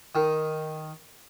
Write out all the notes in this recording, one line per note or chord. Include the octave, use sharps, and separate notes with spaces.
D#3